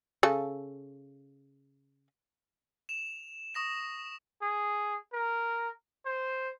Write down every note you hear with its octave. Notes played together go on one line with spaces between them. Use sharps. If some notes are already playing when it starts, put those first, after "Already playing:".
C#3 A4
E7 F7
C#6 D#6 A#6 E7
G#4
A#4
C5